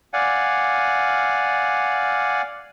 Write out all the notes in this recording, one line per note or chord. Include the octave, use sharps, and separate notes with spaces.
D5 F5 F#5 G#5